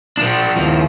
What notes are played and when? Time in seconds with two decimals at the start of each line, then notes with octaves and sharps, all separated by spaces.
0.17 F3 D4
0.57 D#2 F3